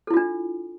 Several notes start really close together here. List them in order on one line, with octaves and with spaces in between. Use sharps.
A4 E4 F4 D4